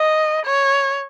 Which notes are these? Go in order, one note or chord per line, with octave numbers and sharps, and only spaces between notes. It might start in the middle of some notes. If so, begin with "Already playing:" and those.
Already playing: D#5
C#5